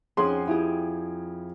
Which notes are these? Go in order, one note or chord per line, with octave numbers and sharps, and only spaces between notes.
F2 C#4 G#4 F#5 G#5 C6
E4 F4 G4 G#4